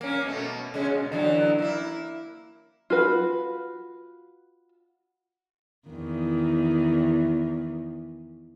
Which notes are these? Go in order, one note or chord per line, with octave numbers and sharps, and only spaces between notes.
A#3 C#4
B2 A3 A#3
C#3 G#3 C#4
B2
D3 E3 F#3
A#3 E4
F4 F#4 B4
E2 D#3